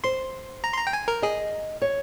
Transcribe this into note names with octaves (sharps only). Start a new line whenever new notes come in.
C5 C6
A#5
C6
A#5
G5
G#5
A#4
G#4 D#5
C#5